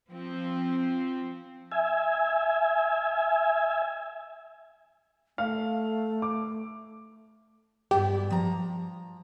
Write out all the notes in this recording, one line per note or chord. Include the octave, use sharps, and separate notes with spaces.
F3 C4
E5 G#5
A3 F5
D6
G2 B3 G4
F3 A#5